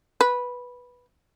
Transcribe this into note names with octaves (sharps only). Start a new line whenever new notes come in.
B4